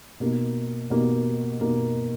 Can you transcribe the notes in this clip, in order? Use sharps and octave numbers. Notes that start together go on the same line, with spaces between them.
B2 A#3 D#4
B2 A#3 D#4
B2 A#3 D#4